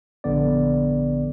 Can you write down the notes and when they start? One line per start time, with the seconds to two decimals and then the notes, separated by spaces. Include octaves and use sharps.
0.24 A#1 D3 B3 D5